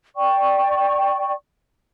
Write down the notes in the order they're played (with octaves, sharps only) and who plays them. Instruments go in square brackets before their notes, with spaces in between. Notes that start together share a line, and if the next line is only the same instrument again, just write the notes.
[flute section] D5 G5 C#6